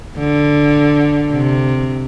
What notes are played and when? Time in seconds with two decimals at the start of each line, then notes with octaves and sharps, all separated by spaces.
0.18 D3
1.32 C3